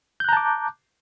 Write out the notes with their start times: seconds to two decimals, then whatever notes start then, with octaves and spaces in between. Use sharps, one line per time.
0.20 G6
0.24 F#6
0.29 A#5
0.33 A5
0.37 D6